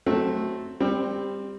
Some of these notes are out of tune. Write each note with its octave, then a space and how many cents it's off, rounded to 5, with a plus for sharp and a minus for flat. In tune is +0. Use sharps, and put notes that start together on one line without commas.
F#3 +0 A3 -10 C4 +0
G3 +20 C4 +0